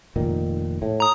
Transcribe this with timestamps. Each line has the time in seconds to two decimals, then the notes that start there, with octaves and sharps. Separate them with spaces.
0.16 F1 A#2 D#3
0.82 A2
1.00 A#5 D#6